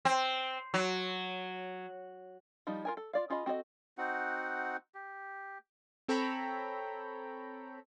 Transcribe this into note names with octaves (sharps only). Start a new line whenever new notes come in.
C4
F#3
F3 G3 D#4
F4 A#4 G#5
A4
F4 D5 F5
C#4 F4 G#4 D#5 B5
C4 F#4 A4 C#5 D#5
C4 D#4 F#4 F#5
G4
C4 A4 C#5 G5 A#5 B5